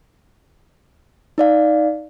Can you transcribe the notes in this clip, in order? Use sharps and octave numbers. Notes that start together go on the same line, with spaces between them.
D#4 D5 F5